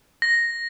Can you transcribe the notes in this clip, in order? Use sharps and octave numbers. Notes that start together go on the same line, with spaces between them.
A#6